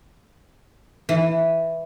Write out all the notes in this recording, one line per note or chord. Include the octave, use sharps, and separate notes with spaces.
E3